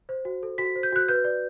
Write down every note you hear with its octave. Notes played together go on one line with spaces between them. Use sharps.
C5
F#4
A4
F#4 B6
C5
G6
F#4 F#6
B4 G6
D5